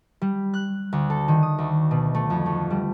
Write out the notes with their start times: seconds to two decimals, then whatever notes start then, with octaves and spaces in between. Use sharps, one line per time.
0.22 G3
0.54 F#6
0.93 D2
1.10 A4
1.28 D#3
1.43 D#6
1.58 D2
1.91 B2
2.15 A3
2.30 F2
2.46 A3
2.70 G3